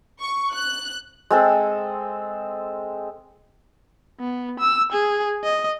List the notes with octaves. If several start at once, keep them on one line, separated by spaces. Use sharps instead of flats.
C#6
F#6
G#3 C4 A4
B3
E6
G#4
D#5